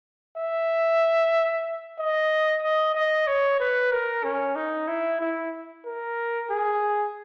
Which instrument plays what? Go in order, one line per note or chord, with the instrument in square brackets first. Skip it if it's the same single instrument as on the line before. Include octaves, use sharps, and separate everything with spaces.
[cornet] E5
D#5
D#5
D#5
C#5
B4
A#4
C#4
D#4
E4
E4
A#4
G#4